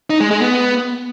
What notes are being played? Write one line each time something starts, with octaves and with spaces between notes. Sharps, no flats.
D#4
G#3
G#3
B3